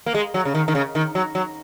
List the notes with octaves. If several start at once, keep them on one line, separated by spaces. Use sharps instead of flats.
A#3
G#3
F#3
C#3
D#3
D#3
C#3
D#3
F#3
F#3